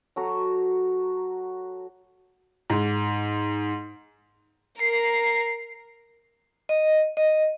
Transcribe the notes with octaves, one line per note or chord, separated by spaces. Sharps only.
F#3 F#4 A4 A#5
G#2
A#4 A#5 C7
D#5
D#5